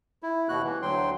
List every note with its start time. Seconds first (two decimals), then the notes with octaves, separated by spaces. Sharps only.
0.23 E4
0.49 D#2 B2 F#4 F#6
0.63 E3
0.82 D2 F#3 G5 C6